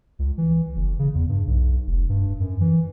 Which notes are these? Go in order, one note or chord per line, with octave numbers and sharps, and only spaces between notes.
C#2
E3
F#1
C#3
E2
G2
B1
F1
G2
F#2
E3